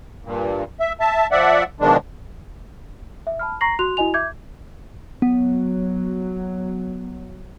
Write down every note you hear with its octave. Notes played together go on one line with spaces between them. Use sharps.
G2 A#2
E5
E5 A5
F3 D5 E5 F#5
B2 D#3 F3 G#3 D4
E5
A5 B5 F6
A#5 C#6 A#6 C7 F#7
F#4 C6 F#6 F7
E4 F#4 D#5 G#5 F7
E5 D6 G6 G#6
F#3 B3